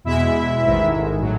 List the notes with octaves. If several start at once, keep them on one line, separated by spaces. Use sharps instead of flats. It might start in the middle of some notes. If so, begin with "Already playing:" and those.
E2 B2 G#3 E4 E5
A1 G#2 D#3 G#3
A2 F#3